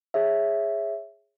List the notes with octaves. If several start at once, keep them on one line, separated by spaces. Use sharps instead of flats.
G#4 C#5 E5